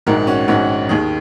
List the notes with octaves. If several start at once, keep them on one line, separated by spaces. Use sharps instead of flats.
A#1 G#2 D#3 F#4 A#4
C#4 F#4
A#1 G#2 D#3 C#4 F#4
D#2 D#3 D#4 G#4